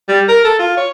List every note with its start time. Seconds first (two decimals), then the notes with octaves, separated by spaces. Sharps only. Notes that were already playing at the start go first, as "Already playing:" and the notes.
0.08 G3
0.28 A#4
0.44 A4
0.59 F4
0.77 C#5